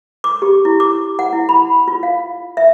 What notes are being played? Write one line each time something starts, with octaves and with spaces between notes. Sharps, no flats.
D6
G4
E4
D6
F#5
E4
B5
F4
F5
E5